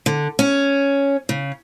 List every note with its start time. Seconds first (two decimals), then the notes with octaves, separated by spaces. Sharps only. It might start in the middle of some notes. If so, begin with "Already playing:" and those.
0.06 D3
0.39 C#4
1.29 C#3